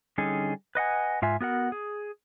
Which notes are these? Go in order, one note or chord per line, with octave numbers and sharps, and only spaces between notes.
D3 G3 C#4 D#4 G#4 A4
B4 D#5 F#5 G#5
G#2 F4 E5 G#5
B3 F#4 A#4 F#5
G#4